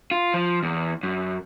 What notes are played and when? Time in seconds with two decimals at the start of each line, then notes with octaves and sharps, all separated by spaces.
0.11 F4
0.34 F3
0.63 E2
1.03 F#2